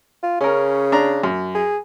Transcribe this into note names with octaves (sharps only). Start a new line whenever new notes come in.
F4
C#3 C#4 A#4
D4 A#5
F#2
G#4